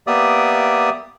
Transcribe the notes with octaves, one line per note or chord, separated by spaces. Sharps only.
A#3 B3 G4 D5 E5 D#6